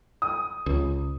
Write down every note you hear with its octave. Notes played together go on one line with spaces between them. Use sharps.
D#6
C#2